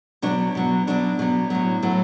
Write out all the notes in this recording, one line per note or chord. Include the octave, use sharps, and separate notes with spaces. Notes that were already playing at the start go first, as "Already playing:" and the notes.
B2 F#3 D4
B2 F#3
B2 F#3 D4
B2 F#3
A2 F#3
A2 F#3